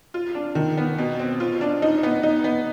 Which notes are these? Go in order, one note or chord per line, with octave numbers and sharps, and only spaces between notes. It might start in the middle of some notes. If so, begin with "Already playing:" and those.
F4
D4
D#3
B3
B2
C4
F4
D4
D#4
B3
D#4
B3